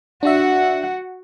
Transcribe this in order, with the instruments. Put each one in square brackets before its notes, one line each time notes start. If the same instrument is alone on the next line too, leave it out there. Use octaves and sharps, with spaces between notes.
[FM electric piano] D4 E5 [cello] F#4 F#5